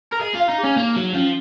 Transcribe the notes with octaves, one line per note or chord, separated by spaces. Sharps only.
A#4
G#4 D#5
F4
F5
D#4
G#4
C#4
A#3 D#4
F#3 D#4
F3 C#4